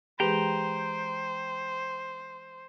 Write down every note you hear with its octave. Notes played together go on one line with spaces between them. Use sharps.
E3 G#3 G4 G#4 B4 C5 G5 A#5